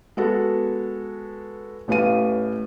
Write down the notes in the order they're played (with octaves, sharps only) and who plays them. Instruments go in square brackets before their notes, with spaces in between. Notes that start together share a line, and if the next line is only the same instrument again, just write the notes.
[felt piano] G#3 B3 F#4 A4
A1 A2 B4 F5 D#7